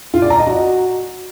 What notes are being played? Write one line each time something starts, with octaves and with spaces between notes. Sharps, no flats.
F4
D5
A#5
D#5
F#4